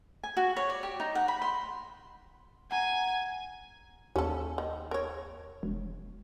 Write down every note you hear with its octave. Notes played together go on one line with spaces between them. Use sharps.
G#5
F#4
C#5
D5
G4
D#4
F#5
B5
C6
F#5 G#5 A#5
D#2 C#4 A4
D#3
A#4 C#5
E1